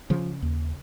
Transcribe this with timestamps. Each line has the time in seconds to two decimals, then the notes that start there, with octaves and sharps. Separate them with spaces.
0.10 C#3 F3
0.42 D#2